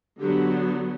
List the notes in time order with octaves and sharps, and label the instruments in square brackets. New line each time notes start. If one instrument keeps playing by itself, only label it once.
[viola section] D3 F#3 B3 G4